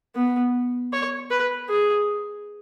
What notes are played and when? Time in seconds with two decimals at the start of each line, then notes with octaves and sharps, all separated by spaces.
0.15 B3
0.93 C#5
1.31 B4
1.69 G#4